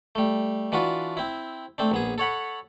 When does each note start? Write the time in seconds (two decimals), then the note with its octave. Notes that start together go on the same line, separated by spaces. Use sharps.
0.15 G3 A3
0.72 E3 D4 F4 F#4 B4
1.17 C4 E4
1.78 A3 C4 D4
1.92 A#1 B3 G#4
2.18 A4 C#5 F#5 B5